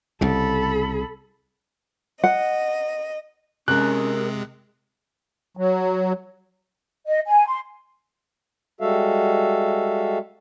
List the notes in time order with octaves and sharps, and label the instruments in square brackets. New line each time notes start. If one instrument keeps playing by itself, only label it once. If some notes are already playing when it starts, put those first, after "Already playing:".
[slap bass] C2 C#3 [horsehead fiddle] A4 B5
[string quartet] D#5 [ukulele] F#5
[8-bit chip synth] C3 G#3 [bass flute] C#4 [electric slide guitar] G4 A#4 A#5 [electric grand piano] F#6
[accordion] F#3
[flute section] D#5
G#5
C6
[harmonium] G3 G#3 F#4 A4 E5 F5